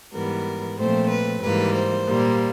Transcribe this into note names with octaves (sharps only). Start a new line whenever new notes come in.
G#2 E3 G3 B3 A#4
A#2 F3 A3 C4 C5
B4
G#2 E3 G3 A#3 B4
C5
A#2 G3 A#3